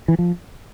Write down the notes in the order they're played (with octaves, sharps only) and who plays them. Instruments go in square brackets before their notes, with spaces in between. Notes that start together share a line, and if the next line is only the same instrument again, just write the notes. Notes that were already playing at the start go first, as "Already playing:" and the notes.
[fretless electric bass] E3
F3